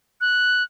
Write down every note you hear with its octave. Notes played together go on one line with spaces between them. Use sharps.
F#6